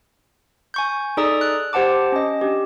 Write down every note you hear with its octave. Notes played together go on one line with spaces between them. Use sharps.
G#5 C#6 G6
D#4 G#4 A4 D5 A#5 D#6
F#6
G4 C5 F#5 A5 D6
C#4 D#5
D4 G4